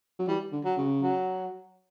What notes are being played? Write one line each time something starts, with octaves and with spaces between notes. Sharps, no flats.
F#3
E3 G3
D3
F#3
C#3
F#3